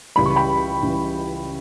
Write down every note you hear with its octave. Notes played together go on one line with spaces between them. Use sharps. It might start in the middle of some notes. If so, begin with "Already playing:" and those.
C#2 C#3 E3 G3 B5
C#6
G5 B5
C#2 C#3 E3 G3